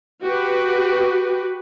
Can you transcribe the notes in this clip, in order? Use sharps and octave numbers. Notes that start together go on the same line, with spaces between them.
F#4 G4 B4